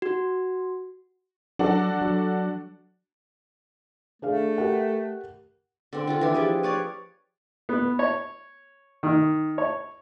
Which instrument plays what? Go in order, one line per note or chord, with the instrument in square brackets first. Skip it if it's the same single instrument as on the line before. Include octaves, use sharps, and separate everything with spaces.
[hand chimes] F#4
[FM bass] F#3 [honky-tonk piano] D4 F#4 A4
[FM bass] F#3
[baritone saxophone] A3 [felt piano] D4 G#4 F5
[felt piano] G4 A#4 F#5
[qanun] D3 C4
D3 F4 A4
E3 D4
F3 G4 G#4
B4 C#5 D5 F5
[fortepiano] B3
C#5
D#3
C#5